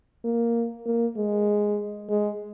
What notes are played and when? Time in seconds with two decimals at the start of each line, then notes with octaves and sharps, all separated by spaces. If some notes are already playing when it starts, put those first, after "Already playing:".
0.24 A#3
0.86 A#3
1.16 G#3
2.09 G#3